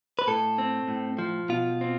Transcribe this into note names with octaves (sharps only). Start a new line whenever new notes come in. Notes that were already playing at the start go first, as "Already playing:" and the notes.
B4
A2 A4
C4
A2
F3
B2 F4
C4